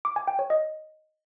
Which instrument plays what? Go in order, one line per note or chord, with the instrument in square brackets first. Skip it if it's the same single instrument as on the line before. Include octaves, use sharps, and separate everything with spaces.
[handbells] D6
G#5
G5
C#5
D#5